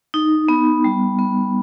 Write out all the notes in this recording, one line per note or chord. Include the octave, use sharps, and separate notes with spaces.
D#4
B3
G3
B3